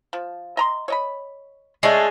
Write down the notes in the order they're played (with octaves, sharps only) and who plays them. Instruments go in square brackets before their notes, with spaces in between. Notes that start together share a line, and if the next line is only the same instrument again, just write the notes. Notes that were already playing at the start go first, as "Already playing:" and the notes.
[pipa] F3
D#5 A#5 C6
C#5 D#5 B5
[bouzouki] G#3 D4 [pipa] A3 C#4 E5